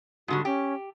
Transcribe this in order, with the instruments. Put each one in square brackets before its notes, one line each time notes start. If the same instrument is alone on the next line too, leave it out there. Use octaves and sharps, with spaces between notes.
[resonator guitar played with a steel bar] G#2 D3 G3 [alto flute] F#4
[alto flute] C#4 [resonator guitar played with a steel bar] G4